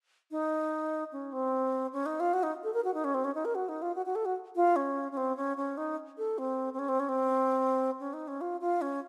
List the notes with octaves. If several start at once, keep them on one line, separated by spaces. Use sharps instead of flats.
D#4
C#4
C4
C#4
D#4
F4
F#4
D#4
A4
A#4
F#4
D#4
C#4
C4
C#4
D#4
A#4
F#4
D#4
F4
F#4
F#4
A4
F#4
F4
C#4
C#4
C4
C#4
C#4
D#4
A4
C4
C4
C#4
C4
C#4
C4
C#4
D#4
C#4
F4
F4
C#4